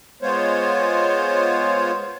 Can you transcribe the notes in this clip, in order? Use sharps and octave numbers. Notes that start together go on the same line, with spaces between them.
G#3 B3 F4 C5 C#5